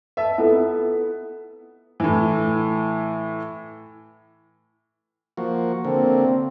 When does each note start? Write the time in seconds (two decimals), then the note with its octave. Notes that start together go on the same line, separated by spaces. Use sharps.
0.17 B4 D#5 E5 A5
0.38 B3 E4 F4 A4
2.00 A2 E3
5.37 F3 A#3 F#4
5.85 D3 A#3 C4